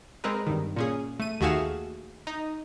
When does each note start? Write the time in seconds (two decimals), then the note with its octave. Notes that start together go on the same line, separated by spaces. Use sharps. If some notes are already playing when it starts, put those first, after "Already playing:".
0.24 G#3 C4 A#4 B4
0.47 G2 D#3
0.76 A#2 C#4 G#4
1.20 A3 D#7
1.41 D#2 A3 F#4 G#4 F5 E7
2.27 D#4